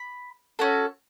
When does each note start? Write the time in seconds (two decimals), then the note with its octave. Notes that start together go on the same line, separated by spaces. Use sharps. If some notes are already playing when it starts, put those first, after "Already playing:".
Already playing: B5
0.59 C#4 F#4 A4